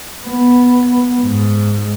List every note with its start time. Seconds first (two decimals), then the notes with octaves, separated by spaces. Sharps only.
0.24 B3
1.21 G#2